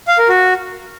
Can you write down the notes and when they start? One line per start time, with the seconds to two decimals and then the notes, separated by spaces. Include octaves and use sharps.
0.08 F5
0.18 A#4
0.29 F#4